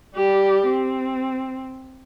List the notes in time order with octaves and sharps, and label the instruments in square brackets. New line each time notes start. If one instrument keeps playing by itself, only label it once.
[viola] G3 G4
C4